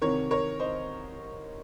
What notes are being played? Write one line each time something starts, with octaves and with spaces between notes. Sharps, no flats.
C2 C3 D#3 A#4 C#5
A#4 C#5
C5 D#5